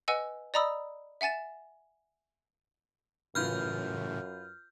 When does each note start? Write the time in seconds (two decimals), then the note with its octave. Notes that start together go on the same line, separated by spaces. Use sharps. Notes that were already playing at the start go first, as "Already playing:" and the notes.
0.08 B4 D#5 F#5 G#5 E6
0.54 D5 D#5 A#5 B5 D#6 E6
1.21 E5 F#5 G#5 A6 E7
3.35 F#2 A2 C#3 E3 F4 B4 F6 G6